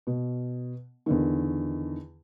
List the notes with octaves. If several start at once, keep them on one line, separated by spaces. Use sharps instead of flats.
B2
E2 D3 D#3